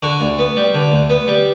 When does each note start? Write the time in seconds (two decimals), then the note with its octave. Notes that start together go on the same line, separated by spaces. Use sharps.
0.03 D3 F#4
0.21 D2
0.39 B3
0.56 G3
0.74 D3
0.92 D2
1.10 B3
1.27 G3